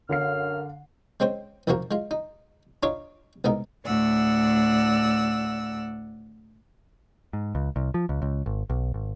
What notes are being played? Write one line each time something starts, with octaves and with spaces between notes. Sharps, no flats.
F#2 D3 F5 F6 C7
G#3 C4 C#4 C5
C2 F#2 F3 A#3 F#4 A#4
G#3 F4
D#4
D4 D#4 F4 C#5 F5
C2 G#2 B3 D#4 A#4
D2 A2 D5 F#5 E6
G#2
C#2
C2
F3
C#2
C#2
G#1
B1
G#1